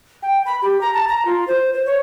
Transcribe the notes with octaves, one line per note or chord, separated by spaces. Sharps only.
G5
B5
G4
A#5
A5
A#5
F4
C5
C5
C#5